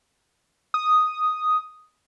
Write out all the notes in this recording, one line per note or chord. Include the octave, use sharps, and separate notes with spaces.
D#6